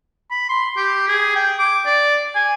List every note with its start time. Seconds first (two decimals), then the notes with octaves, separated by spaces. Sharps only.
0.31 B5
0.49 C6
0.77 G4
1.08 G#4
1.35 G5
1.59 D6
1.86 D5
2.35 G#5